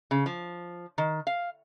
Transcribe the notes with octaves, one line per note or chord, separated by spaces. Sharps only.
C#3
F3
D#3
F5